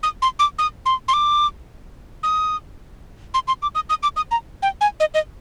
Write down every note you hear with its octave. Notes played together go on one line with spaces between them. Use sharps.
D#6
C6
D6
D#6
C6
C6
D6
D#6
C6
C6
D6
D#6
D#6
D6
D#6
A#5
G5
G#5
D#5
D#5